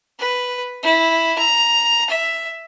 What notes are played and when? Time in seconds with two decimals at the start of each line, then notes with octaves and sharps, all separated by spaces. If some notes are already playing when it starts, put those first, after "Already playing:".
0.19 B4
0.83 E4
1.39 A#5
2.10 E5